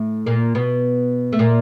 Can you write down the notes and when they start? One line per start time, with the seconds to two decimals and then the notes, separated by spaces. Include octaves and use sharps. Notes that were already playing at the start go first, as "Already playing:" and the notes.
Already playing: A2 A3
0.26 A#2 A#3
0.55 B2 B3
1.33 A3
1.39 A#2 A#3